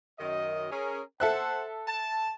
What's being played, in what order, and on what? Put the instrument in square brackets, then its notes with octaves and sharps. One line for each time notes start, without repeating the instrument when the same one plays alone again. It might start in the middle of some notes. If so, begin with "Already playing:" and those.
[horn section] F#2 D#3 D#5
C#4 G#4 A#4
[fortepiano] A4 E5 F#6 [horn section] C5 F#5
[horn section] A5